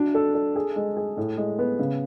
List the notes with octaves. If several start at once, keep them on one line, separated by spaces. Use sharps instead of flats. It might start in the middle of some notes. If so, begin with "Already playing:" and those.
Already playing: D4 F#4
A4
A4
G#4
G#3
G#4
A2
G#3
B3
C#3